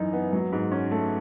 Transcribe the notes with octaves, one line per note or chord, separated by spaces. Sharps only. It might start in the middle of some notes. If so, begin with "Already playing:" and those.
Already playing: F#2 E3 D#4
B3
F#3
G#2
C#4
A3